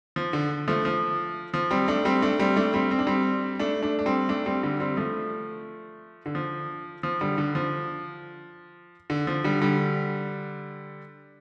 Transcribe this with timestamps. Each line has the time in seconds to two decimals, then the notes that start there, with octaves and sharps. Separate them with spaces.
0.16 F3
0.33 D3
0.68 F3 A3
0.85 F3
1.54 F3
1.71 G3 C4
1.88 A3 D4
2.05 G3 C4
2.22 A3 D4
2.39 G3 C4
2.57 A3 D4
2.74 G3 C4
2.91 C4
2.99 D4
3.07 G3 C4
3.59 A3 D4
3.82 A3 D4
3.99 D4
4.06 G3 C4
4.29 A3 D4
4.46 G3 C4
4.63 D3 G3
4.80 G3 C4
4.97 F3 A3
6.26 D3
6.35 F3
7.03 F3
7.21 D3 G3
7.38 D3
7.55 F3
9.10 D3
9.27 F3
9.44 D3 G3
9.61 D3 G3